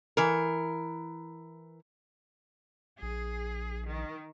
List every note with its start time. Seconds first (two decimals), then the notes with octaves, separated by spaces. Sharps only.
0.17 E3 A#4
3.02 A#1 G#4
3.90 D#3